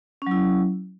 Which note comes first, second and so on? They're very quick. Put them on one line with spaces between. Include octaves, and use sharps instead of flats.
C#4 F#3 E4